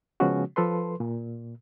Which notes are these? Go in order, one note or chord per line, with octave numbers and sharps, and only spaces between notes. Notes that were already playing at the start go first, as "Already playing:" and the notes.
C#3 F3 G#3 B3 C#4 F#4
F3 A4 B4 C6
A#2